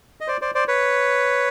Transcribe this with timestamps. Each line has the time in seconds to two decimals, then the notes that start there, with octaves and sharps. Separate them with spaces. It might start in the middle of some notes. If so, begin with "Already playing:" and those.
0.21 D#5
0.27 C5 D5
0.42 C5 D5
0.55 C5 D5
0.68 B4 C#5